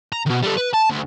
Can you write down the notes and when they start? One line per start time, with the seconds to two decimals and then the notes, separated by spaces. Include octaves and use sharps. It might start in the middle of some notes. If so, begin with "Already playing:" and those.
0.13 A#5
0.26 B2 D#3
0.44 G3 A4
0.58 B4
0.74 A5
0.90 D2